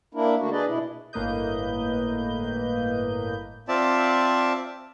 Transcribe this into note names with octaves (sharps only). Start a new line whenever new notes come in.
A#3 D4 E4 A#4
D3 A3 A#3 D4 F#4
D4 G#4 B4 D5 D#5
B2 E4
G1 A2 A#3 B4 D#5 G6
C4 F4 D5 E5 A5